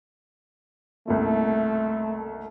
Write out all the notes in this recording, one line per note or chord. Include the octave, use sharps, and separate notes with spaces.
F#1 C2 A3